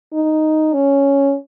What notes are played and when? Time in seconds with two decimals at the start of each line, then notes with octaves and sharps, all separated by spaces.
0.14 D#4
0.73 C#4